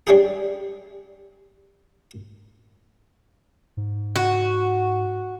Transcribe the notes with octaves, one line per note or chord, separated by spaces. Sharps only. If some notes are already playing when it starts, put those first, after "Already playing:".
G3 G#3 C#4 D4 G4 G#4
G#2
F#4